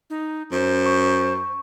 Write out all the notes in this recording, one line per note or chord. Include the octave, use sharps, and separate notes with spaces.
D#4
F#2 C5
C#6